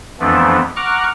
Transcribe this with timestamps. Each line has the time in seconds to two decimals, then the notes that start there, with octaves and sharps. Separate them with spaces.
0.20 F2 E3 F3 A3 B3 D4
0.76 F#5 A#5 C#6 D6 F6 F#6